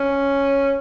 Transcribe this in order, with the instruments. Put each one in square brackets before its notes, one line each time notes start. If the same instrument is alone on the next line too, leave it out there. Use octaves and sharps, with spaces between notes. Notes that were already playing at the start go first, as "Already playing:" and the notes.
Already playing: [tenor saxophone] C#4